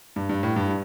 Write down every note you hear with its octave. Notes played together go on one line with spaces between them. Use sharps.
G2
G2
A2
G2